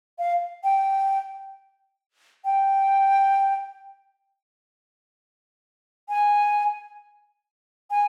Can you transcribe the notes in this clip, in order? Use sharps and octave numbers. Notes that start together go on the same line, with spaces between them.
F5
G5
G5
G#5
G#5